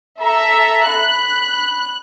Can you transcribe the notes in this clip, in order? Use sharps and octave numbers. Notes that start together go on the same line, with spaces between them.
A4 E5 A#5
B5 F#6